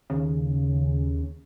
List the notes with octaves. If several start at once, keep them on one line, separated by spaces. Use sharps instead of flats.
D#2 C#3